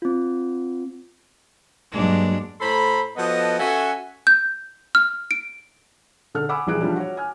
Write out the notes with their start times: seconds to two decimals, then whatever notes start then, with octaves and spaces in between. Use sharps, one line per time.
0.02 C4 F4
1.92 G2 F#3 G#3 A#3 D4
2.61 A2 A4 C5 A#5 B5
3.17 F3 B3 F#4 A4 D#5
3.59 C#4 F#4 A4 E5 F#5 G#5
4.27 G6
4.95 F6
5.31 D7
6.35 D3 A4 F6
6.49 F#5 G#5 B5 D6 E6
6.67 A#1 E3 G3 G#4 F#6 D7
6.81 F3 G3 D4
6.96 F#4 C#5
7.17 G#5 F6